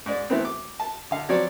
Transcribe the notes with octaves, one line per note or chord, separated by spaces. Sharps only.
G#2 D5
E3 A3 B3 C4
D6
A5
D3 F5
F3 F#3 C4 C#5 D5